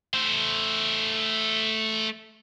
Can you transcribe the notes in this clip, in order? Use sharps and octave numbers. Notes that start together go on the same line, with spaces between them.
A3 C5